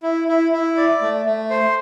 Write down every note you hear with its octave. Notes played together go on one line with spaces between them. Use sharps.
E4
E4
E4
D5
A3
A3
C5